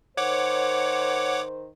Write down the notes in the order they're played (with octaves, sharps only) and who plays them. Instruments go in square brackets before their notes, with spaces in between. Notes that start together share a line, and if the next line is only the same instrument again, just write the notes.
[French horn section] D#3 A#4 C5 [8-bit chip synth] C#5 F#5 D6